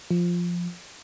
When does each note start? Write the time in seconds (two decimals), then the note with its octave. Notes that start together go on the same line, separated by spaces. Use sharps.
0.11 F3